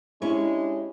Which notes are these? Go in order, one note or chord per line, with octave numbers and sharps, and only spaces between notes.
G#3 C#4 D4 E4 G4 C#5